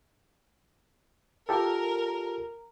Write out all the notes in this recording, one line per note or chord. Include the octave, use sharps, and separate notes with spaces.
F4 G4 A4 A#4